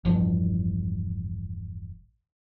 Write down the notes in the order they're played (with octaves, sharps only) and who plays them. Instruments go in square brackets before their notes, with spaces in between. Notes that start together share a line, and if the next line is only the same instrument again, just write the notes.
[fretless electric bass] E1 A1 G2 F3